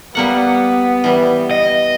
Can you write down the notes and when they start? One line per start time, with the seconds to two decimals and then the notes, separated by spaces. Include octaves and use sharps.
0.15 G3 A#3 B3 F#5
1.04 E3 G3
1.51 D#5